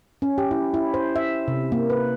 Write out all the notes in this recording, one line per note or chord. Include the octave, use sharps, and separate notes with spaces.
C#4
G4
E4
E4
C5
E5
C3
A#3
B4